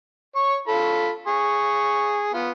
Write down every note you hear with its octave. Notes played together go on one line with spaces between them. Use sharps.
C#5 C#6
F4 A4 B5
G#4 C#6
B3 F4